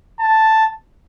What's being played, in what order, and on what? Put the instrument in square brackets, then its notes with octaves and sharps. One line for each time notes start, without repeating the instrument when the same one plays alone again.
[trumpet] A5